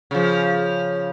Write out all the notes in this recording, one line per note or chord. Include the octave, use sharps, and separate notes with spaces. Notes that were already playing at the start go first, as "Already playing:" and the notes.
C#3 F3